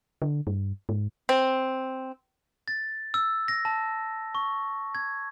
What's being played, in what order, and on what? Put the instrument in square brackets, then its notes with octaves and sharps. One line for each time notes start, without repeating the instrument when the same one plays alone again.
[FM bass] D3
G2
G#2
[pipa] C4
[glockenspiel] A6
E6
A#6
A5
C#6
G#6